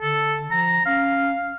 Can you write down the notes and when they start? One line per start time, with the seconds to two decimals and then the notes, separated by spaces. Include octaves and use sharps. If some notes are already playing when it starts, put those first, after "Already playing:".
0.01 D3 A4
0.51 F3 A#5
0.86 C#4 F5